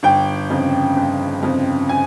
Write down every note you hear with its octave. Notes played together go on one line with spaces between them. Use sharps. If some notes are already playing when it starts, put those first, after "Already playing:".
G1 G5
F2 C#3
G1
F2 C#3
G#5